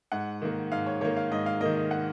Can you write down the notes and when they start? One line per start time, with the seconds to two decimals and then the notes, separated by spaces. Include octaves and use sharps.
0.12 G#2 F#5
0.42 D#3 A#3
0.72 G#2 F5
0.86 C#5
1.01 D#3 C#5
1.05 A#3
1.16 F5
1.31 G#2 D#5
1.46 F5
1.61 D#3 A#3 D#5
1.76 D#5
1.91 F#5